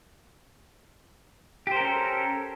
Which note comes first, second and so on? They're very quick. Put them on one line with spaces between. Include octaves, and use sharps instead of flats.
G4 C5 A#4 C#4 A4